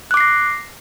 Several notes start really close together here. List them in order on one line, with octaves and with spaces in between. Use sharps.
F#6 D6 C7 A#6